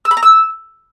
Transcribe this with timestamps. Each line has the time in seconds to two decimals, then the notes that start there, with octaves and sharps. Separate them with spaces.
0.05 E6
0.11 B5
0.17 A#5
0.23 E6